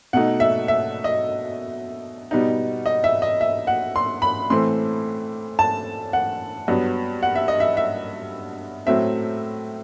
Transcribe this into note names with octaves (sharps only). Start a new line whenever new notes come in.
B2 A3 D#4 F#5
E5
E5
D#5
B2 G3 B3 D#4
D#5
E5
D#5
E5
F#5
C6
B5
A2 E3 A3 C4 C6
A5
F#5
G2 F#3 B3
F#5
E5
D#5
E5
E5
A2 F#3 A3 C4 E5